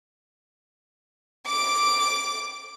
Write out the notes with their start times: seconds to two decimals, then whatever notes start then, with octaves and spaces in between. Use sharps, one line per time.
1.47 D6 D7